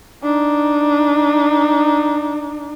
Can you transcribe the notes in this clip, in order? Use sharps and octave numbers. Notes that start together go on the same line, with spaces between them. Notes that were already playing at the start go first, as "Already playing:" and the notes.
D4 D#4